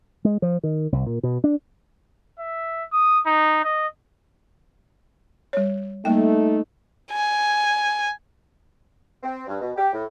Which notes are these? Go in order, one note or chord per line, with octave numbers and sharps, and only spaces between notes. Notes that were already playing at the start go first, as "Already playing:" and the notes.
G#3
F3
D#3
C2
A#2
B2
D4
E5
D#6
D#4
D#5
G3 C#5
G3 A3 A#3 D#4 G5
G#5
C4
G2
B2
G4
A2